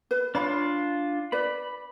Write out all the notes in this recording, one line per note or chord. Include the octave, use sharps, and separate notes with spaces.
B4
D4 F4 C#5 F5 B5
B4 D5 B5